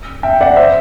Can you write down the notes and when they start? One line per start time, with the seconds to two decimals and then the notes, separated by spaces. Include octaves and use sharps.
0.23 E5 G5
0.41 D5 F#5
0.57 C5 E5